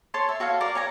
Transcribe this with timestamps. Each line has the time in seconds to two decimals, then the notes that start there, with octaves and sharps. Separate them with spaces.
0.14 A4 C#5 A5 C6
0.29 E5
0.40 F#4 A4 C#5 F5
0.61 A#4 D5
0.75 C#5 G#5 A#5